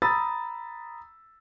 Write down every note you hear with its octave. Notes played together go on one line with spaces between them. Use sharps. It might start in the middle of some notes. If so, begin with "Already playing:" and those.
A#5 B5 D#6 E6 A6